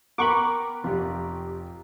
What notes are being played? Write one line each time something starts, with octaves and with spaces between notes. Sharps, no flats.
B3 A#4 F#5 G5 A#5 B5 C#6 D6
F1 F4 G4